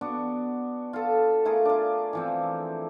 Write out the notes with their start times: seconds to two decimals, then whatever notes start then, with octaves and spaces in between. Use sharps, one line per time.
0.01 B3 D4 F#4
0.93 F4 A4
1.45 A3 F4 G#4 A#4
1.65 D4 F4
2.13 E3 F3 C4